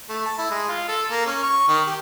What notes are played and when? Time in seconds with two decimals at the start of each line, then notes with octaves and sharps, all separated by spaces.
0.09 A3
0.26 A5
0.38 E4
0.51 G#3
0.69 F4
0.88 A4
1.11 A#3
1.26 C#4
1.43 C#6
1.68 D#3
1.86 G4